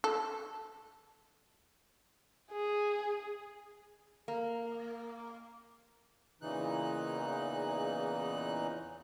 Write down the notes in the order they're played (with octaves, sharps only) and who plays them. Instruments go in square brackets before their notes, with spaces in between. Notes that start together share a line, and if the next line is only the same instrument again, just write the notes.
[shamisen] A4
[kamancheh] G#4
[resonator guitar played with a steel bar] A#3
[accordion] E2 A#2 C#3 E3 D#4 F#6